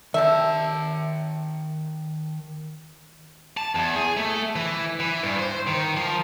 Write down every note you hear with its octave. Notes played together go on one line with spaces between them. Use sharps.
C3 D#3 E5 A5
A5
E2
G#4
A3
E3
E3
G2
C5
D#3
F3